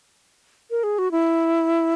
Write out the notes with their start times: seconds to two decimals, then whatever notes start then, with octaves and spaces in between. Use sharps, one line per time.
0.71 A#4
0.83 G#4
0.99 F#4
1.12 E4